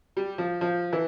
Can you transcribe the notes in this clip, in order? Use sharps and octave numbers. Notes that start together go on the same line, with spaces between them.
G3
F3
F3
E3